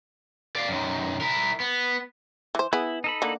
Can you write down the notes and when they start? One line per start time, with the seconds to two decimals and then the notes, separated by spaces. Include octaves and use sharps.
0.56 D5 F5
0.69 F#2 D#3
1.21 E4 A#4
1.60 B3
2.55 E3 C5
2.73 B3 E4 G#4
3.04 D#4 A4 B5
3.22 D3 A#3